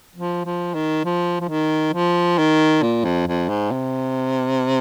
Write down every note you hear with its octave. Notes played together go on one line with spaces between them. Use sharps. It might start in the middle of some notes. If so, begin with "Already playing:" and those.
F3
F3
D#3
F3
F3
D#3
F3
D#3
A#2
F2
F2
G#2
C3